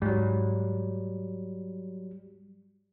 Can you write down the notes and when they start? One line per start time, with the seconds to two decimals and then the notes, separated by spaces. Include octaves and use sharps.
0.02 G#2 F#3 G3